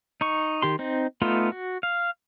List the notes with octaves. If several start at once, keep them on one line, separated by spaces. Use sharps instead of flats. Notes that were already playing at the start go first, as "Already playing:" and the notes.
D#4 C#6
D#3 G4 C6
C4 D#4
A3 B3 D#4 F4 C6
F#4
F5